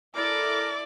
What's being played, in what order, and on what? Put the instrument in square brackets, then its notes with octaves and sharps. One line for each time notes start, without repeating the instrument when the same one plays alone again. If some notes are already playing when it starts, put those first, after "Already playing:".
[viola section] E4 A4 [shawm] A#4 [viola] D5 [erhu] D6